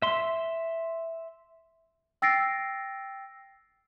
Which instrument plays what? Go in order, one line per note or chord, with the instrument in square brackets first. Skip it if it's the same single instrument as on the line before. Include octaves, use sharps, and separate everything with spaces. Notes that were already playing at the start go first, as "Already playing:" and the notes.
[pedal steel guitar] E5 C6
[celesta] G5 E6 A6 A#6 C7 D7